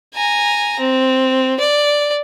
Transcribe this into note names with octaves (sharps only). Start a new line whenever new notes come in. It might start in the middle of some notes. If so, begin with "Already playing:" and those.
G#5 A#5
C4
D5